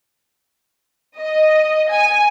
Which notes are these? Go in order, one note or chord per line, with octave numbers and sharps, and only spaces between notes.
D#5
G#5